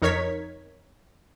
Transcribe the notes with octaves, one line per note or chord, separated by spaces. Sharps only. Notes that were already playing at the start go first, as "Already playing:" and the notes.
F2 D#4 A#4 C#5 G#6 B6